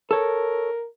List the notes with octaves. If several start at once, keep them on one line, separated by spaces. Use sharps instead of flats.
A4 A#4 C#5